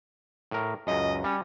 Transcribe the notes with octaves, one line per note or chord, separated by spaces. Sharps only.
A2 A#4
C#2 F#2 D#5
G3 C#4